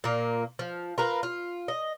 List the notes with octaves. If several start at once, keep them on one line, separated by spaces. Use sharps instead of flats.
A#2 A#3
F3
F4 A#4 B4
F4
D#5